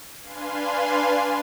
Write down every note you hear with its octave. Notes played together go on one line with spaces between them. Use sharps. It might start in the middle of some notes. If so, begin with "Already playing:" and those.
D4 B4 F5 G#5 C6